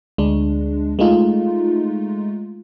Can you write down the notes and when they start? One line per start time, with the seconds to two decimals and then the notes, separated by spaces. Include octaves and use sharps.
0.18 D2 G#3 D4
0.99 G#3 A3 D#4 F4